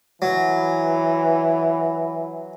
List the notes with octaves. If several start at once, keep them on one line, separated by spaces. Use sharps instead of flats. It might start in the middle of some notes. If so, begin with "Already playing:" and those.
E3 F#3